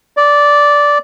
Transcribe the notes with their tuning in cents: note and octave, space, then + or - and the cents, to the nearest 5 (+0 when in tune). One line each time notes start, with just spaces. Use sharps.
D5 -10